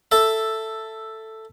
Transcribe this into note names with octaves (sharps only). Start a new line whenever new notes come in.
A4 E5